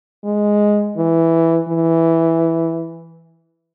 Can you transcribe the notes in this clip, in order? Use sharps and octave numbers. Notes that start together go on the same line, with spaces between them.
G#3
E3
E3